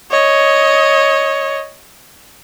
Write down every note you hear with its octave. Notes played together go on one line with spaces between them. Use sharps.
C#5 D#5